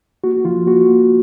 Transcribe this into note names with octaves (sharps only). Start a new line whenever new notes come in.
A#3 F#4
F3 F4
A#3 F#4
A#3